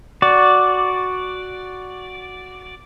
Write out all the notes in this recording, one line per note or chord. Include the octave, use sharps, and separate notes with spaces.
F#4 D5